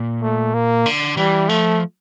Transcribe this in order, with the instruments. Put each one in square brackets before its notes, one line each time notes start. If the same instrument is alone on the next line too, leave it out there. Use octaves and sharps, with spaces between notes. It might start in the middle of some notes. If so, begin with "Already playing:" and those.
Already playing: [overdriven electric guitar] A#2
[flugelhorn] A3
A#3
[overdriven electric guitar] D3
[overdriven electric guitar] E3 [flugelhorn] G3
[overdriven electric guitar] F3 [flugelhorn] A3